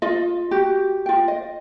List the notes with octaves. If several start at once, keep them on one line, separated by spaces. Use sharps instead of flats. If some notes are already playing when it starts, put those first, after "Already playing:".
F4 D#5
F#4 G4
F4 G5
D#5